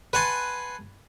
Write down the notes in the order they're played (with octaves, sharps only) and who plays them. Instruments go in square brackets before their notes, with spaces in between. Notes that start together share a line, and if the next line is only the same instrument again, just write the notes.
[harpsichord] B4 F#5 G#5 A5 C6